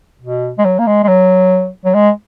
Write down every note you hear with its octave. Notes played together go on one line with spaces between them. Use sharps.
B2
G#3
F#3
A#3
G#3
G#3
F#3
F#3
G#3